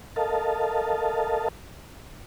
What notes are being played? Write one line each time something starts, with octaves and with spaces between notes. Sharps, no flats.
A4 A#4 D#5 F5 A5